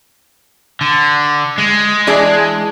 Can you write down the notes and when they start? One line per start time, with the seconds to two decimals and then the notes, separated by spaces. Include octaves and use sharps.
0.81 D3
1.58 G#3
2.07 E3 D4 G#4